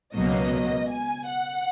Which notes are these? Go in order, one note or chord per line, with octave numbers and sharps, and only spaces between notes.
C#2 B2 F#3 A#3 D#5
G#5
F#5